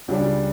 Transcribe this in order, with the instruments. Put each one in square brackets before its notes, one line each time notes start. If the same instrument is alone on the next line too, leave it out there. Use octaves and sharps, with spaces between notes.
[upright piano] C#2 C#3 G3 D4